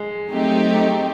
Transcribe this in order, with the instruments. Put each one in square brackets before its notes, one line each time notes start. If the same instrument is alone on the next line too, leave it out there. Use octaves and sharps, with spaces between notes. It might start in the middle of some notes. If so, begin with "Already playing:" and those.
Already playing: [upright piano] G#3
[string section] F#3 A3 C4 D#4 G4